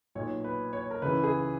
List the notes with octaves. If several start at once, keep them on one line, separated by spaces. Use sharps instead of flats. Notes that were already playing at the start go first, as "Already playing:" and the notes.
B1 A#2 C#5
B4
C#5
A#4
C#2 C#3 E3 B4
G#4